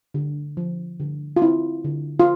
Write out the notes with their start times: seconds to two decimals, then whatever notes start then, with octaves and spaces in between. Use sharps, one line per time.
0.14 D3
0.57 F3
1.00 D3
1.36 F4
1.41 C4 E4
1.84 D3
2.20 F4